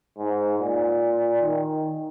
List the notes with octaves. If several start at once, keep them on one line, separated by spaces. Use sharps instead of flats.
G#2
A#2
D#3